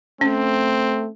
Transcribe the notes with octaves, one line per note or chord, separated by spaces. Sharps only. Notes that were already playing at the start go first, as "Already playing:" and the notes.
A3 C4 C#4